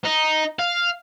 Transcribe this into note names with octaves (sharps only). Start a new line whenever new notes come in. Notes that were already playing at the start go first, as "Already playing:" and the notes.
D#4
F5